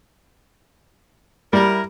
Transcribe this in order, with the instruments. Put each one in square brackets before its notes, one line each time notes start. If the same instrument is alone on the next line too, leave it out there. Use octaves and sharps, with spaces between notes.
[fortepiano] G3 [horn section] E4 A#4